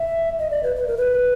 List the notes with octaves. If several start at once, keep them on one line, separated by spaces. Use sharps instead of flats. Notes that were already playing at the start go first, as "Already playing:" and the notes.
Already playing: E5
D#5
D5
B4
B4
A#4
B4